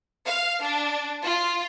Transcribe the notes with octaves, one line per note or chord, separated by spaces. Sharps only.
F5
D4
F4